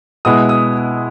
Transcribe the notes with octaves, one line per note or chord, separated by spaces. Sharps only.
B2 G#3 B3 E4 D#6
D#6